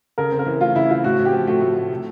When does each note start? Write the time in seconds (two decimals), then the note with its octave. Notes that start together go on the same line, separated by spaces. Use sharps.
0.18 C#3 A#4
0.32 C4
0.39 A#4
0.46 E3
0.61 A3 F4
0.75 C#3 E4
0.90 C4 F4
1.04 A2 F#4
1.19 A2
1.25 G4
1.33 F3
1.47 A3 F#4
1.61 A2
1.76 A2
1.91 C3